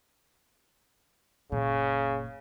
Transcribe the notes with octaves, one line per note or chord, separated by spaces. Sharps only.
F#1 A#2 C#3